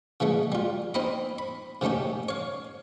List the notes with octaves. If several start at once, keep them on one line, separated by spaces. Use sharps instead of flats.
C#3 E3 G#3 A3
G3 F4
C4 D#4 D#5 B5
B5
C3 D#3 A3 C#4 G4
C#5 F5